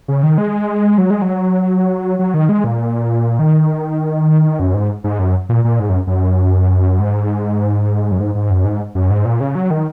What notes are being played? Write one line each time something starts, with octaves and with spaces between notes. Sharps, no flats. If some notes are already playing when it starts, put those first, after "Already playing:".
C#3
D#3
G#3
F#3
G#3
F#3
F#3
D#3
G#3
A#2
D#3
F#2
G#2
G#2
F#2
A#2
A#2
G#2
F#2
F#2
G#2
F#2
G#2
G#2
F#2
G#2
F#2
G#2
A#2
C#3
F#3
D#3